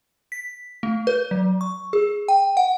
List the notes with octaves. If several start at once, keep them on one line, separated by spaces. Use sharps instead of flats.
B6
A3
B4
F#3
C#6
G#4
G5
F#5